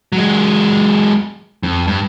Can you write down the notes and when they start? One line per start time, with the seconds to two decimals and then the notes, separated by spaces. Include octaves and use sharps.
0.12 F#3 G#3
1.63 F2
1.87 G2